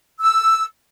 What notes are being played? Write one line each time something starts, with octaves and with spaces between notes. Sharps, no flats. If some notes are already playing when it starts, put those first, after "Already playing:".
E6